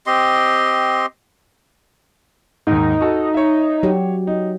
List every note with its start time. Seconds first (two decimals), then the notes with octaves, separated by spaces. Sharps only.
0.07 C4 G4 D#5 C6
2.67 D#2 G#2 D#4
3.01 F#4 A4
3.34 C#5 E5
3.83 F#3 F#4 G4
4.27 D#4